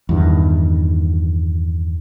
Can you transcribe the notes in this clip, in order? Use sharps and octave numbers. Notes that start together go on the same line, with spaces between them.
E2 G2 D#3